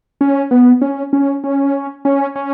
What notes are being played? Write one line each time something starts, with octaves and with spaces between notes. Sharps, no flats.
C#4
B3
C#4
C#4
C#4
C#4
C#4